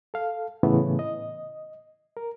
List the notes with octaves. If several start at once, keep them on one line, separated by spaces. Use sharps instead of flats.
A4 F5
A2 C#3 E3 A3 B3
D#5
A#4